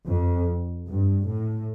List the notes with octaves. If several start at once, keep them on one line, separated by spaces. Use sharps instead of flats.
F2
G2
A2